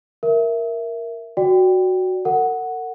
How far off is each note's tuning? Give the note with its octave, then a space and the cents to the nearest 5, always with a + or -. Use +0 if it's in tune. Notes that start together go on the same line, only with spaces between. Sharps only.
A#4 +0 E5 +5
F#4 +0 D5 +0 G5 +0
A#4 -45 F#5 +0